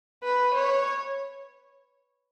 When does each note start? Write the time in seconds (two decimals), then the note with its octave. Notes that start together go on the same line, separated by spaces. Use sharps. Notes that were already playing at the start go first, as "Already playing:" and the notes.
0.23 B4
0.55 C#5